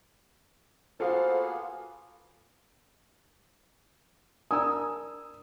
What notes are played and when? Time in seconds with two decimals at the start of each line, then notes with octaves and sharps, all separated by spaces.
1.00 A#3 B3 F4 F#4 G#4 A4 C5 F5
4.51 D4 A#4 G#5 D#6 E6